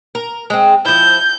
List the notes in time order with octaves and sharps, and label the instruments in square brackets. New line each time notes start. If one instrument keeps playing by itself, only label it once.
[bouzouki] A#4
G#3 C4
[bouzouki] F3 E4 [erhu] G6